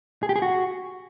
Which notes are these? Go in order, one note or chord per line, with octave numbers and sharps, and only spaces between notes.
G#4
G4
G#4
F#4